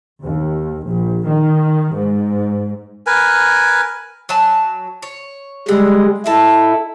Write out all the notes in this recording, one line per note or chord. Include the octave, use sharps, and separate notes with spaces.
D#2
A#1
D#3
G#2
A#4 B4 G#5
F#3 G#5 A5
C#5
D3 G3 G#3 C4
D#4 E4 A4